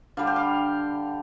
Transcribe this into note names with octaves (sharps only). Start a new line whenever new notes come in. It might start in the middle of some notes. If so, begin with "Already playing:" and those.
D3 G3 F5
G5
F5